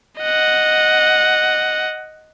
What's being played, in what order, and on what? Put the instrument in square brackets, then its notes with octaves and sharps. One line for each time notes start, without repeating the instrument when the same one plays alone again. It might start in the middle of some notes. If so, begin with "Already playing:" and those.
[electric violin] D#5 F#5